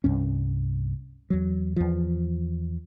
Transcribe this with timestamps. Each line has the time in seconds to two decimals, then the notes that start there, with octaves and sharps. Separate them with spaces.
0.04 C2 G2 C#4
1.30 E2 F#3
1.76 E2 F3